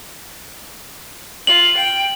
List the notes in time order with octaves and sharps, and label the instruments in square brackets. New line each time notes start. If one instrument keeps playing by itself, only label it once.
[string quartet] F4 [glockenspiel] F#7
[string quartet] G5